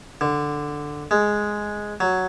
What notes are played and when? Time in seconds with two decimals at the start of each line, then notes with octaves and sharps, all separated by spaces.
0.21 D3
1.11 G#3
2.00 F#3